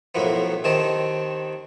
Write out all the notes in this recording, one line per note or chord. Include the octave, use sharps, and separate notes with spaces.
B1 F2 A2 A#3 B3
D#2 D#3 C4 D#5 A5